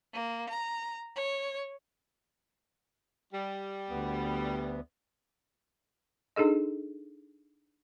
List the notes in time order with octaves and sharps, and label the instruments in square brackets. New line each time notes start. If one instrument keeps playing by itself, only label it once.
[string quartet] A#3
A#5
C#5
[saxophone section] G3
[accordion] D2 B3
[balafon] D4 D#4 G#4 A4 D#5